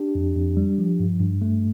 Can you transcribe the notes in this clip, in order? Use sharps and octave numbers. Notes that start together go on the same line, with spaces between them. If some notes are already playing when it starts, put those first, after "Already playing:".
Already playing: D4 G4
F2
F2
G3
F3
G2
G2
A3